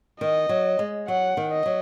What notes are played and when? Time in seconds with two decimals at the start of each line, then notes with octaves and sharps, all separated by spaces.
0.20 D#3 D#5
0.49 F#3
0.79 G#3
1.08 F#3 F#5
1.37 D#3
1.52 D#5
1.66 F#3